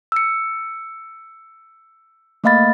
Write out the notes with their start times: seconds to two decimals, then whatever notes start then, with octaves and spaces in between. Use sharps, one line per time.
0.12 E6 C#7
2.44 A3 A#3 D#5 F5 B5 A6